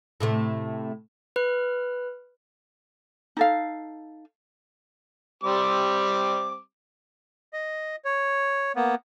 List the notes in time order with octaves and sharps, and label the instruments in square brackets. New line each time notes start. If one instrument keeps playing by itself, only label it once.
[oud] A2 C3 A3
[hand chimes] B4 F#6
[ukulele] D#4 A4 F5
[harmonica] G3 C4 D6
[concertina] D#5
C#5
A#3 B3